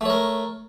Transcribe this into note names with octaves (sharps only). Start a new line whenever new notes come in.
A3 A#4 C#5